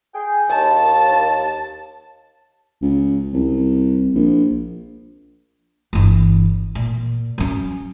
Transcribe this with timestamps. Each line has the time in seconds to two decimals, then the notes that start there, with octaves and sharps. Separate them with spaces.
0.14 G#4 G5
0.49 D#2 A5
2.82 C#2
3.33 C2
4.14 A#1
5.93 G1 E3
6.75 A#2
7.38 F#3 C#4